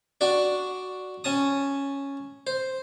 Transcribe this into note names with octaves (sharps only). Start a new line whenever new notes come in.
D4 F#4 D5
C#4 A5 D#6
C5